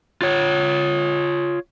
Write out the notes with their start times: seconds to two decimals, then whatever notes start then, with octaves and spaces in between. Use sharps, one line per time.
0.22 F4 C#5